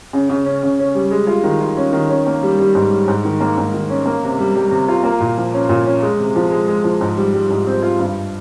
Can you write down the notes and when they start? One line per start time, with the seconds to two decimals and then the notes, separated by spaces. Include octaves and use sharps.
0.13 C#3
0.29 C#3
0.45 C#4
0.63 C#3
0.79 C#4
0.95 G3
1.11 G#3
1.27 F4
1.44 D#3
1.61 F4
1.77 C#4
1.93 D#3
2.09 C#4
2.27 A#3
2.43 G3
2.59 G3
2.75 G#2
2.91 G3
3.08 G#2
3.25 D#3
3.41 A#3
3.58 G#2
3.74 D#3
3.90 C#4
4.06 A#3
4.23 C3
4.39 G3
4.55 G3
4.71 C3
4.88 F4
5.04 A#3
5.20 A#2
5.37 F3
5.53 C#4
5.69 A#2
5.86 C#4
6.02 G#3
6.19 C3
6.36 F3
6.51 G#3
6.68 G#3
6.84 F3
7.01 G#2
7.17 G3
7.33 G3
7.50 G#2
7.67 C4
7.82 F4
7.99 G2